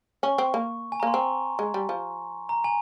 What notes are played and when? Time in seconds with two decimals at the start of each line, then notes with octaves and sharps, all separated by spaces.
0.23 C#4 C#6
0.38 C4
0.54 A#3
0.92 G#5
1.00 A#5
1.03 A#3 C6
1.14 C4 C#6
1.59 G#3
1.74 G3
1.89 F3
2.49 A#5
2.64 G#5